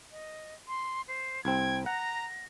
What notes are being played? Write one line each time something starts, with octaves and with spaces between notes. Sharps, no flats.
D#5
C6
C5
C2 C4 G5 G#6
F#5 A#5 A#6